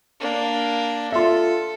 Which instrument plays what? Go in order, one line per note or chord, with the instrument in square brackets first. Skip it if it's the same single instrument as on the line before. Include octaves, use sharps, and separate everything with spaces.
[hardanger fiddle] A#3 D4
[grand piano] F4 E5 [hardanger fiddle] A4